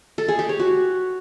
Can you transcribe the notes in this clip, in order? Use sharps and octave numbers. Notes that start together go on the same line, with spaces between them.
A4
G#4
G4
C#5
F#4